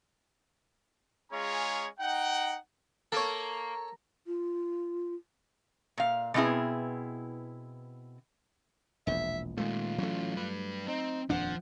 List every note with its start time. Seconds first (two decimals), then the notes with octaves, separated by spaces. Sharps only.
1.32 G#3 C#4 F4 G#4 C#5 A#5
1.99 D#4 F#5 G5
3.12 A#3 A4 C#5
4.27 F4
5.98 A#2 F5
6.34 B2 B3 C4 E4 G#4
9.07 E1 A#1 E2 E5
9.57 A#2 D#3 G#3 A3 F4
9.98 E3 F#3 A3 C#4
10.35 G2 B4
10.87 C4 D#4
11.30 D#1 F2 F3 D4 F#5